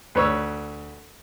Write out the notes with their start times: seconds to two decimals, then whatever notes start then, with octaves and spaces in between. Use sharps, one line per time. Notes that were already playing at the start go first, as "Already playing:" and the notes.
0.15 D2 B4 C#5 C#6 E6